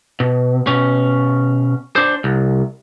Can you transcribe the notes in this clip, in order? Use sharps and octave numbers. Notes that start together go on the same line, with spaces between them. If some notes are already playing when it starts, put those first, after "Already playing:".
B2
B2 C#4
D4 C5
C2